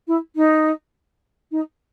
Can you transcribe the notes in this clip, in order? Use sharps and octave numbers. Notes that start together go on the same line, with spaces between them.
E4
D#4
D#4